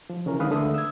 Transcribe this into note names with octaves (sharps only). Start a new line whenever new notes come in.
F3
C#3 E3 C#4 A#4
D3 D#3 G#3 B4 F5 D#6
D3 A3 E5 D#6
E6 G#6